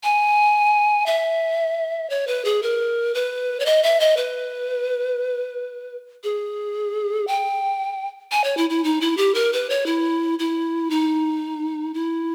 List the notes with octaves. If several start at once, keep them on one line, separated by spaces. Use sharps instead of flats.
G#5
E5
C#5
B4
G#4
A#4
B4
C#5
D#5
E5
D#5
B4
G#4
G5
G#5
C#5
E4
E4
D#4
E4
G4
A#4
B4
C#5
E4
E4
D#4
E4